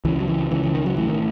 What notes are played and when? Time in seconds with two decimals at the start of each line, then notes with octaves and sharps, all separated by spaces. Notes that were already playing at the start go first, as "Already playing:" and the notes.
0.05 C#2 C#3 E3
0.20 F#3
0.28 E3
0.51 C#2 C#3 E3
0.63 E3
0.75 D#3
0.86 F#3
0.97 A1 A2 E3
1.07 D#3